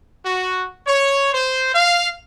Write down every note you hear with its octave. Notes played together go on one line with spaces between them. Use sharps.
F#4
C#5
C5
F5